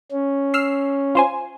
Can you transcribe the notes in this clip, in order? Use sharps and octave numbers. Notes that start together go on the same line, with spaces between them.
C#4
E6 F6 C7
F4 C5 G#5